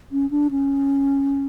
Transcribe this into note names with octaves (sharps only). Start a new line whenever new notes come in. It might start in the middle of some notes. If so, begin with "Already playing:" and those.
C#4
D4
C#4